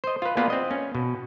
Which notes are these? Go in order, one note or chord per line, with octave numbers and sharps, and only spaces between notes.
C5 D#5
F4 B4
A#3 B3 F4 G#4 B4 D5
C4 D#5
C#4
B2